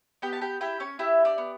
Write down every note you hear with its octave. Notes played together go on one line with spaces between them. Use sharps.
B3 G4 G5
A5
G4 G5
E4 G4 G5
C#4 C#5
E4 G4 E5
D4 D5
B3